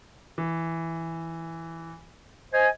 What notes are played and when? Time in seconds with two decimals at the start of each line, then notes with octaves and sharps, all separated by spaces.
0.38 E3
2.53 C5 D#5 G#5